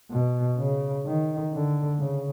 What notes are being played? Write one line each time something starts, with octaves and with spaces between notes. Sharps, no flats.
B2
C#3
D#3
D3
C#3